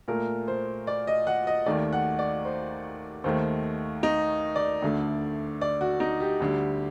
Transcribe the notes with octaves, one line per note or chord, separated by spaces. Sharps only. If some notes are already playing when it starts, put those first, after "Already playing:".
A#2 A3 A#4
C5
D5
D#5
F#5
D#5
D#2 D#3 A3 D5
F#5
D5
C5
D#2 D#3 A3 C5
D#4
D5
D2 D3 A3
D5
F#4
D#4
G4
D2 D3 G3